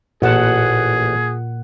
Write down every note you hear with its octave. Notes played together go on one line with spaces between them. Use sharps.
A1 A#2 G#4 F#5 A5